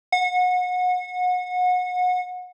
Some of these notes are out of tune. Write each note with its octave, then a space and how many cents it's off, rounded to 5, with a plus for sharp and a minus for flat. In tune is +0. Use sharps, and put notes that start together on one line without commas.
F#5 -30